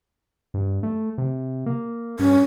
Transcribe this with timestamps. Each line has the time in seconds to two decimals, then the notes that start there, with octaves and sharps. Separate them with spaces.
0.54 G2
0.83 A3
1.18 C3
1.66 A#3
2.19 G2 C#4